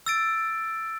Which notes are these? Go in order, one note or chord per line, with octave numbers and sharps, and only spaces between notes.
E6 A6 D7